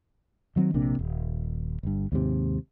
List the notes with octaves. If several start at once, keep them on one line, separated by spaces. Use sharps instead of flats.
D#3 F#3 C4
A#1 C3 A#3 D4
D#1
G1 G2
D#2 G#2 C3